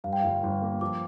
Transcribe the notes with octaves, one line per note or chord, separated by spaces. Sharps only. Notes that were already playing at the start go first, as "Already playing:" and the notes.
G2 F5
G5
G1 F5
G1
A#3
F3 D6